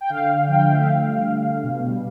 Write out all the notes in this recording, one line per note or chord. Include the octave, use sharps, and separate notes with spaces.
G5
D3 F5
D3
F3 G5
F5
A3 E5
F5
D3
G3
G3
D3
B2
G3